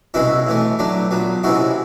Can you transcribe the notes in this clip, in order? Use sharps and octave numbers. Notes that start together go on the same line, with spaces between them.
C2 B2 G#3 C#4 E4 F#4
A2 E3 A3
A2 F#3 A3 D4
A#2 F#3 B3
C3 E3 G#3 C#4 E4 F#4